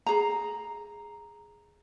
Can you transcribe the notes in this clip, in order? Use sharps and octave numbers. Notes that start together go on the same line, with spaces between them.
G#4 A#5